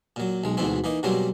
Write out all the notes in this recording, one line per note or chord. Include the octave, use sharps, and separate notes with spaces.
A#2 F#3
B1 G#3
D2 G#2 B2 E3 C4
E3 A#3 D#4
B2 F#3 G3 A#3 C4 C#4